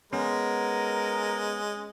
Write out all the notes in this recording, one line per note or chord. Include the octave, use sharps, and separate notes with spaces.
G#3 B3 C#4 A#4